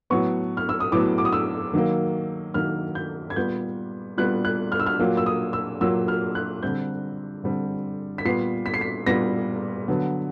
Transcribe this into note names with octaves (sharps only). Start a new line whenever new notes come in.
A2 F#3 B3 C#6
F6
E6
D#6
A2 F#3 B3 D6
D6
D#6
E6
D#3 F#3 A#3
D#3 F#3 A#3 F6
G6
G#6
A#2 G3 B3 G6
A#2 G3 B3 F#6
F#6
F6
E6
F6
A#2 F#3 A#3
E6
D#6
E6
A#2 F#3 A#3 E6
F6
F#6
D3 G3 C4 G6
D3 G3 C4
B6
A#2 G3 B3 C7
B6
C7
B6
A#2 G3 B3 A#6
D3 F#3 B3